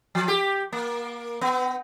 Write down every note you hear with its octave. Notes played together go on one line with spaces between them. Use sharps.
F3
G4
A#3
B3